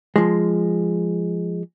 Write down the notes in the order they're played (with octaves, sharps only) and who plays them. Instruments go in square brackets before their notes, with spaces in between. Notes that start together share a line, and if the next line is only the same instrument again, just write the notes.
[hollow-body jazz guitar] F3 G#3